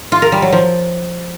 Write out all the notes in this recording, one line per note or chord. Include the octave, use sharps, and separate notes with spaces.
F4
A#4
G3
F#3
F3